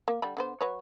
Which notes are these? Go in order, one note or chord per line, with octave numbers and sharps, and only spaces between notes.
A#3
D3 G3 B5
D3 B3 C5
F#3 B4 C#5